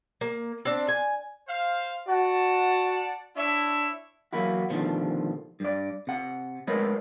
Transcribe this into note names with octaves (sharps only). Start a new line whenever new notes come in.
A#3
C4 D4
G#5
C5 F5
F#4 D5 F#5 A5
D4 E4 C#5 E5
E3 F#3 A#3 E4 F#4
B2 D3 D#3 F3 G3 A3
G2 D5
C3 F#5
G#3 A3 A#4 B4 C#5 D#5